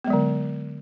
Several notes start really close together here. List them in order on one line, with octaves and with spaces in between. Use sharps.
B3 G#3 F#3 D3